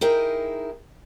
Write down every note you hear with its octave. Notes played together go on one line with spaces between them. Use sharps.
D#4 E4 G#4 A#4 G5